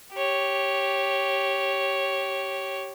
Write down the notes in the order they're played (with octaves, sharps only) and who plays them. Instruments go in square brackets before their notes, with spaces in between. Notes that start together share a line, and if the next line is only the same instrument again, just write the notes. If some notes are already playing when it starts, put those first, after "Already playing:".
[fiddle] G4 C#5